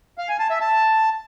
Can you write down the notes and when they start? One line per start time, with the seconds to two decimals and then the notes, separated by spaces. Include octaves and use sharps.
0.18 F5
0.29 G#5
0.40 A5
0.50 E5
0.61 A5